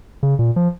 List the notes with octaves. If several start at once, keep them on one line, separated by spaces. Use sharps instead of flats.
C#3
A#2
F3